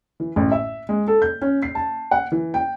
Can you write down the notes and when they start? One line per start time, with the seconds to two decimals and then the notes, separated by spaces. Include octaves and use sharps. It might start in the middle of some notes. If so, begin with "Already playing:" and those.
0.20 E3
0.36 A1
0.52 E5
0.89 G#3
1.08 A4
1.22 G6
1.42 C#4
1.62 C7
1.75 A5
2.11 F#5
2.32 E3
2.54 G5